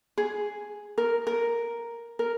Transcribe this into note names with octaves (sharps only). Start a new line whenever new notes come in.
G#4
A#4
A#4
A#4